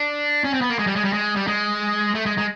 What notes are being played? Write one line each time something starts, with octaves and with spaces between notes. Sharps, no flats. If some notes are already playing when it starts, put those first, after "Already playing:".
Already playing: D4
C#4
C4
B3
A#3
G#3
G3
G#3
G3
G#3
G3
G#3
A3
G#3
G#3